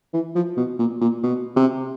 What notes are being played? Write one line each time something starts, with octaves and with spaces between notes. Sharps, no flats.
E3
F3
B2
A#2
A#2
B2
C3